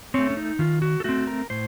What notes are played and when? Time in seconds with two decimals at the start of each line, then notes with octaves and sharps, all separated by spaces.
0.14 A3 C4 C#5
0.30 C#4
0.37 D#4
0.59 D#3 F4
0.82 F#4
1.00 A4
1.04 A3 C4 F#4
1.27 A#4
1.50 A2 C5